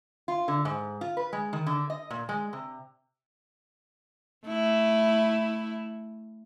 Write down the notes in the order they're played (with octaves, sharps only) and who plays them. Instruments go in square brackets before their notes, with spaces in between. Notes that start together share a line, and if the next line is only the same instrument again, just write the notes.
[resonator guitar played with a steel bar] F4
D3
G#2
F4
B4
G#3
D#3
D3
D#5
A#2
G#3
C3
[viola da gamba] A3 E4